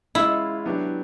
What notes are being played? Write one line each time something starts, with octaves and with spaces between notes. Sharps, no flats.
G#3 C#4 E4 F4
F#3 B3 D4 G4